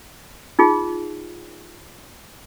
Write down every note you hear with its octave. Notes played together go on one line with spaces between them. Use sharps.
D#4 F4 G#4